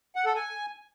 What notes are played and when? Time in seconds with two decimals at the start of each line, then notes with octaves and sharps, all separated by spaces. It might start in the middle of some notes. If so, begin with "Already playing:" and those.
0.16 F#5
0.25 A4
0.35 G#5